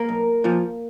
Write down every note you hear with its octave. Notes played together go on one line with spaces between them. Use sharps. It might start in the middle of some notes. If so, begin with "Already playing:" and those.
Already playing: A#3 A#4
B1
A#2 F3